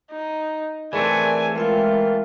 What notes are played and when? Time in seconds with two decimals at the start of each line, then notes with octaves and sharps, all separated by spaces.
0.11 D#4
0.93 E3 A3 C4 G#4 A#4 D5 G#5
1.56 G#3 F4 A#4 E5 G5